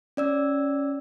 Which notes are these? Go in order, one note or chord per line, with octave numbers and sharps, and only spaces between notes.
C#4 D5 E6